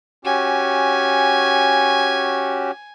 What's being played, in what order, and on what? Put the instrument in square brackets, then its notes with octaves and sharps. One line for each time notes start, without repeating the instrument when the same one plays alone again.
[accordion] C#4 F#4 G4 [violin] G#5